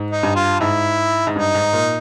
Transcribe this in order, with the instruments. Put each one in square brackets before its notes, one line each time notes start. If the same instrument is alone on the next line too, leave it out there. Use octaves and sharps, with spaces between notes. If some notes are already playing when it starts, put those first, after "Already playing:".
Already playing: [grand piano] G#2
[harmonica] D#4
[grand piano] G2
[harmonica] F4
[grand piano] G#2 [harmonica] E4
[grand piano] G#2
[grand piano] G2 [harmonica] D#4
[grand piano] G#2
A#2